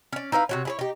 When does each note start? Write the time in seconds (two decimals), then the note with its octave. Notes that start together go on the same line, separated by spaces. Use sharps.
0.13 C#4 D5
0.32 D#4 E4 B4 F5
0.49 C3 F#4 C#5
0.65 E4 G#4 C#5
0.79 D#4 G4